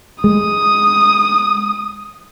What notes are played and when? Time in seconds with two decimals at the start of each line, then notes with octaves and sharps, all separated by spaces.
0.24 G#3 D#6